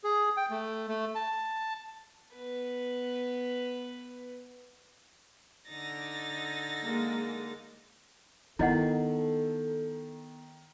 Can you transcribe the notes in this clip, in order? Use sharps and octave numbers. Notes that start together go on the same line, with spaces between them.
G#4
G5
A3
A3
A5
B3 B4
D3 D#4 A6 A#6
G#3 A#3
D#3 B3 E4 A4 D#5 F#5